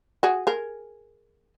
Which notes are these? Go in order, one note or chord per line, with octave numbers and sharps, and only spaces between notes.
F#4 G#4
G#4 A#4